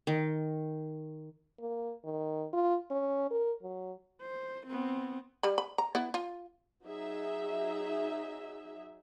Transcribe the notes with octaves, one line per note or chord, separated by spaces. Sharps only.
D#3
A#3
D#3
F4
C#4
A#4
F#3
C5
B3 C4
G3 B5
B5
A#5
B3 E4
F4
F#3 D#4 G#4 E5